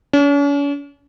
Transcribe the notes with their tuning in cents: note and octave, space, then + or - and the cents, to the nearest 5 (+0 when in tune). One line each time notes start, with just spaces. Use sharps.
C#4 +45